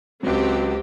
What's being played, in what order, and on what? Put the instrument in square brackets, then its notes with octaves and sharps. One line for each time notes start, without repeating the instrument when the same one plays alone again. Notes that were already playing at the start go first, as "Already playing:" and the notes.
[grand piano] C#2 F#3 [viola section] C4 F#4 G4